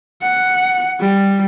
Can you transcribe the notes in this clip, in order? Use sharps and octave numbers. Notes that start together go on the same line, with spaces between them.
F#5
G3